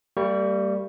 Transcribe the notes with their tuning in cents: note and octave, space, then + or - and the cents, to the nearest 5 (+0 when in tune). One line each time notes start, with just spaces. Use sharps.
G3 +0 A#3 -40 C#6 +0